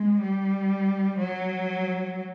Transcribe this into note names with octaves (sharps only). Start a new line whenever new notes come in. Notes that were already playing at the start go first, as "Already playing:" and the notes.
Already playing: G#3
G3
F#3